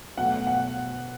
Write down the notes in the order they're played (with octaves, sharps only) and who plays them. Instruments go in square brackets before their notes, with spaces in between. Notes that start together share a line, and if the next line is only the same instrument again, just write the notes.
[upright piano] B2 F#3 A3 F#5
F#5